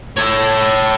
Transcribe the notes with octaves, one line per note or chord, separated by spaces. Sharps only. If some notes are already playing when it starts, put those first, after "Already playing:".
A4 C#5